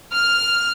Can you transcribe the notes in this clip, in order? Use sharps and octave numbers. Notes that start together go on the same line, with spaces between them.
F6